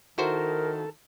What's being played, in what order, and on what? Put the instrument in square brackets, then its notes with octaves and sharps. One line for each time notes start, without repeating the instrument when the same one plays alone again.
[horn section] D#3 [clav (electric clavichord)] E4 F#4 C5 [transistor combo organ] A4 [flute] A#4